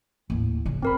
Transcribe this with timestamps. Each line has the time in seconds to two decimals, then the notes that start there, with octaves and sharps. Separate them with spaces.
0.30 D#2 A2
0.66 C#3 C#4
0.82 G2 C4 A#4 B5